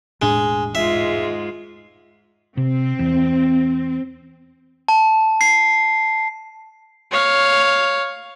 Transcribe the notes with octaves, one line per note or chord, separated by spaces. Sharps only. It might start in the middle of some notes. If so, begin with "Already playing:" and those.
E1 A2 G#3 D4
G#2 G#3 F4 E5
C3 C4
E2
A5
C7
C#5 F5